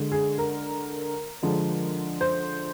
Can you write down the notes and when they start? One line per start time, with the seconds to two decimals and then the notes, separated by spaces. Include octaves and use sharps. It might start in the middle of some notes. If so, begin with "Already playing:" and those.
Already playing: D3 G#3
0.12 G#4
0.38 A#4
1.43 D3 F3 G#3
2.21 C5